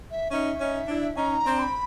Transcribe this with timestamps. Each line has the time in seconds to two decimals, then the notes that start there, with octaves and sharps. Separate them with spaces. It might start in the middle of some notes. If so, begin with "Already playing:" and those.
0.11 E5
0.31 C#4 D#4 E5
0.61 C#4 D#4
0.88 D4 E4
1.16 C#4 D#4 A#5
1.44 C4 D4
1.59 C6
1.63 B5